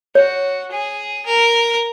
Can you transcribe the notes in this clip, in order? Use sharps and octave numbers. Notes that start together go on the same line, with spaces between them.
F#4 C#5
G#4
A#4